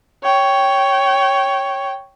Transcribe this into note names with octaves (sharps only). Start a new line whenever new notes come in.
C#5 G5